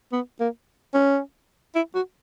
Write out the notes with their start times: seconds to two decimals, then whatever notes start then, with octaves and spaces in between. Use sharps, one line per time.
0.13 B3
0.40 A#3
0.94 C#4
1.75 E4
1.95 F#4